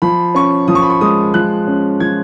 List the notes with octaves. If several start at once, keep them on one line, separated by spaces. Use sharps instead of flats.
F3 B5
C#4 C#6
F3 D#6
C#6
B5
C#6
G#3 D#6
F3 F#6
C#4
F3 G#6